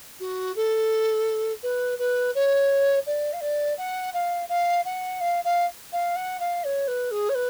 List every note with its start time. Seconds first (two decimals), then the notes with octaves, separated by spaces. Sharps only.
0.20 F#4
0.56 A4
1.63 B4
1.99 B4
2.35 C#5
3.07 D5
3.33 F5
3.42 D5
3.78 F#5
4.14 F5
4.49 F5
4.85 F#5
5.21 F5
5.44 F5
5.92 F5
6.16 F#5
6.40 F5
6.64 C#5
6.88 B4
7.11 G#4
7.29 C#5
7.35 B4